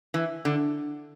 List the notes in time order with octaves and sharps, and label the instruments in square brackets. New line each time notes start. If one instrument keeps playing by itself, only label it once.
[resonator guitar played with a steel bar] E3
D3